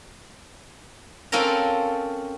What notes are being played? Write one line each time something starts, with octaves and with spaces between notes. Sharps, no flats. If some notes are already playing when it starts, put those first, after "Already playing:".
C4 C#4 F4 A4 A#4 A#5